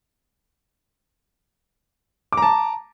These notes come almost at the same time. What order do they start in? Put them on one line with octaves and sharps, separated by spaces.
D6 A#5 A5